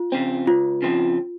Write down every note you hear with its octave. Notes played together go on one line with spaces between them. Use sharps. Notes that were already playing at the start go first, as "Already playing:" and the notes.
Already playing: F4
C#3 F3 C4
C#2 F4
C#3 F3 C4